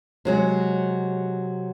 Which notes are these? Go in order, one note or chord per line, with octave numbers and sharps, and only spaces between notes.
C3 F#3 G#3